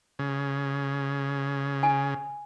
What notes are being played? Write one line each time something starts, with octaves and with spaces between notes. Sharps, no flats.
C#3
G#5